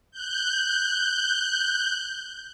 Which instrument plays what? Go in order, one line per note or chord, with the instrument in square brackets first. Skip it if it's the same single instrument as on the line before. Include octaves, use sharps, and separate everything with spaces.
[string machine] F#6 G6